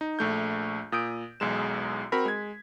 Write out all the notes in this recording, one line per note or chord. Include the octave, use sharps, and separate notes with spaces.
D#4
A#1 A3 G6
A#2 D#6 G6 D7
B1 E2 G#3 E7
C4 F#4 A#4 B5 B6
G#3 G#6